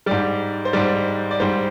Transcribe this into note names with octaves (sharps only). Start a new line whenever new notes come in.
G#2 G3 D5
C5
G#2 G3 D5
D5
G#2 G3 C5